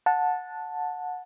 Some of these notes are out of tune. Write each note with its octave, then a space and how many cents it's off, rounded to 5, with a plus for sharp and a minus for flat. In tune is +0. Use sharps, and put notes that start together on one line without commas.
F#5 -20 A5 +0